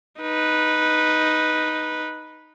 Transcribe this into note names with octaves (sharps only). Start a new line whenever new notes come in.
D#4 B4